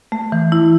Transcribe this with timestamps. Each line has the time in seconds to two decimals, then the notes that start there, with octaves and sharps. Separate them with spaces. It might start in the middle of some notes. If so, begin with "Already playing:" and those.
0.12 A3
0.32 E3
0.52 E4